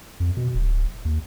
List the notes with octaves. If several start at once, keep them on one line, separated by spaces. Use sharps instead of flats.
F2
B2
D1
D#2